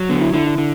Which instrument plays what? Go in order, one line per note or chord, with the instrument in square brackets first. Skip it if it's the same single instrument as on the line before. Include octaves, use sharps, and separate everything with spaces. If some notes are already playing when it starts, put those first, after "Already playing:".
Already playing: [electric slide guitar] F#3
[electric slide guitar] D3 [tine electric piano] B3
[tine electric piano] E4
[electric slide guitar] D3 [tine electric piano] E4
[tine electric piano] E4
[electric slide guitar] D3